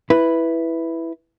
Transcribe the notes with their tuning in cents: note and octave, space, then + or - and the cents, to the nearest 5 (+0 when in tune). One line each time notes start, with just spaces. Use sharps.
E4 +0 B4 +0